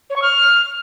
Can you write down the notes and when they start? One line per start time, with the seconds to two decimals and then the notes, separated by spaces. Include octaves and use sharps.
0.10 C#5
0.16 C#6
0.22 F6